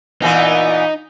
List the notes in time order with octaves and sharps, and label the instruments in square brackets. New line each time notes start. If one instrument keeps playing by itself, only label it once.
[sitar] A#2 E3 B3 [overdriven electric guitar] D#4